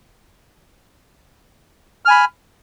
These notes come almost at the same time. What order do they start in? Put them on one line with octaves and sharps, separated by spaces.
F6 G#5 B5